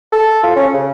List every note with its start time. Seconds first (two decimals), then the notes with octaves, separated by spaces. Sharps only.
0.13 A4
0.44 F4
0.56 C#4
0.74 C#3